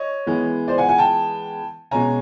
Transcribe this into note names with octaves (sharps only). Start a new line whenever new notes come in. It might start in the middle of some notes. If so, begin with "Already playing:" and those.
Already playing: C#5 D#5
E3 G#3 B3
C5 D5
F#5 G#5
F#5 G#5
G5 A5
B2 G#3 C#4 G#5 A#5